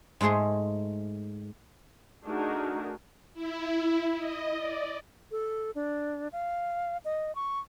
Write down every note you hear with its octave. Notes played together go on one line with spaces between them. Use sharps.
G#2 G#3 A3 G#4 C6
A3 D4 D#4 F#4 G#4 A#4
E4
D#5
D5
A4
D4
F5
D#5
C#6